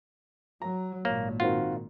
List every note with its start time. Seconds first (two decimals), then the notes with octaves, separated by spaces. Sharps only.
0.62 F#3 A#5
1.05 G#1 A#2 A#3 C#5
1.40 D#3 C4 F4 F#4